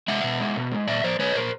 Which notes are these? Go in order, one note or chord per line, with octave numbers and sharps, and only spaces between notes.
G#3 E5 F#5
B2
G#3
B2
G#3
A#2 D5 E5
F3 C5 D5
G#3 B4 C#5
A#2 A#4 C5